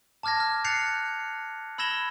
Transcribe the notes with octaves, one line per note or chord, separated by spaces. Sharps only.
A5 D6 F6 G#6 A#6
F6
F#6 G6 A6 C7 C#7 F7
B5 E6 G#6 A#6 E7 G7